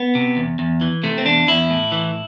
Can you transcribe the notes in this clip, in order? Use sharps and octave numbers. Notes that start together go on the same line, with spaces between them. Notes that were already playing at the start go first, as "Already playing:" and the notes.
Already playing: B3
C3
E2
E2
E3
C3 A3
C4
E2 D4
E2 E4
A2
E3